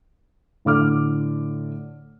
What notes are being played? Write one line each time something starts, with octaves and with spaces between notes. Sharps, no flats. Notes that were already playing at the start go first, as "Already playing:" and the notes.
A2 D3 D6 F6